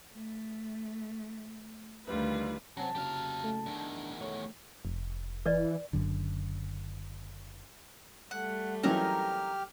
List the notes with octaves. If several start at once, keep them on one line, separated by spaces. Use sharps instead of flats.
A3
D2 D#3 G3 F4 B4
C3 F#3 C4 C#4 A5 A#5
C#3 F#3 A#3 G4 F5
A3
E2 D#3 D4
A3 C#5
F1
E3 B4 D5 D#5
F#1 F#2 D3
G3 A3 F#5
E3 F#3 C4 C#4 D#4 G4 A#4 F6